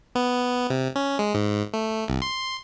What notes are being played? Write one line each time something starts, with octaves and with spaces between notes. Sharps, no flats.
B3
C3
C#4
G#3
G#2
A3
C2
C6